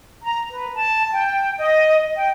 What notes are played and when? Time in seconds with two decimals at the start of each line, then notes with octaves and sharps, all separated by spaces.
0.23 A#5
0.51 B4
0.75 A5
1.14 G5
1.58 D#5
2.17 G5